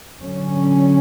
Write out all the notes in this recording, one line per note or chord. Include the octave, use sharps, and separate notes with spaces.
D3 F#3 C#4